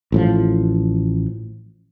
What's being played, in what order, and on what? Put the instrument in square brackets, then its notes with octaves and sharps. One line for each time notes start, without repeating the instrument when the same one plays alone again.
[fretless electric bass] A1 A2 F3